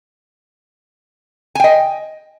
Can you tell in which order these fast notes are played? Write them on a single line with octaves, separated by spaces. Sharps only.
G#5 G5 D#5